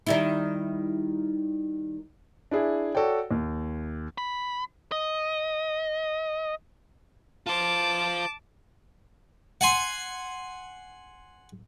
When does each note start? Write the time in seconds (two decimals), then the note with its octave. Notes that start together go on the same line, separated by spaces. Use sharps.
0.06 D#3 G3 E4
2.51 D4 E4 G#4
2.95 F#4 A4 C#5 D5 G5
3.31 D#2
4.18 B5
4.92 D#5
7.47 F4 C5 A5 D6
9.61 F#5 G#5 C6